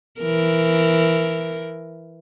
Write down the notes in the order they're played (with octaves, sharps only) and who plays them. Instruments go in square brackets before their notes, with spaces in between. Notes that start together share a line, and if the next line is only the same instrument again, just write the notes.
[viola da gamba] E3 A#4